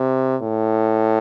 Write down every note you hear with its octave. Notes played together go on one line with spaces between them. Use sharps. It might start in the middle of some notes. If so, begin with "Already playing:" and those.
Already playing: C3
A2